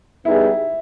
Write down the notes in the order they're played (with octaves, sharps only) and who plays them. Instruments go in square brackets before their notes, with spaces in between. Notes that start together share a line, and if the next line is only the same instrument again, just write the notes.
[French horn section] G3 B3 D#4 G#4 B4 [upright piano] E4